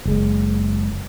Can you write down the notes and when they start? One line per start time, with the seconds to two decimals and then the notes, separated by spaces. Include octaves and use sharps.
0.05 F#1 G#3